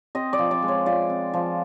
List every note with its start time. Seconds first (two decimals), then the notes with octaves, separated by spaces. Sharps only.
0.15 C4 D#5
0.33 D5
0.39 F3
0.51 D5
0.62 G#3
0.68 C#5
0.86 F3 D5
1.10 C4
1.34 F3